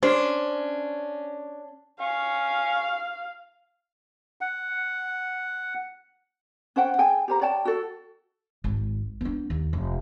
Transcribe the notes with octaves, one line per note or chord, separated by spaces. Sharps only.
C#4 D4 C5
C#4 F5
F#5
C#4 C5 F#5 G5
G#4 G5 G#5
G4 C5 A#5
C#5 D5 G5 A5
F#4 A4
G#1
B3 D4
D#2
F1